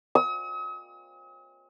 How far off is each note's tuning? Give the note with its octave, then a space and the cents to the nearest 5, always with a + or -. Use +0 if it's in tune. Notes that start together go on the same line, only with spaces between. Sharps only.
D#6 +45